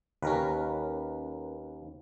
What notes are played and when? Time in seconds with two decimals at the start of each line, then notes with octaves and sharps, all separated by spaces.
0.22 D#2 C#4 A#4 B4